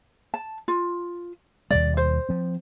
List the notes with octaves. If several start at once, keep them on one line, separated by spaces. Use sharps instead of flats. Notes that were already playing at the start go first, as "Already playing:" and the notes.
A5
F4
D#2 B2 G3 D5
C5
F3 C4